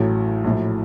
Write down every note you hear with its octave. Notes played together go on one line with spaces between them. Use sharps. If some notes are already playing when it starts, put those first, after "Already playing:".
Already playing: A1 A2 F#3
A#1 A2 F#3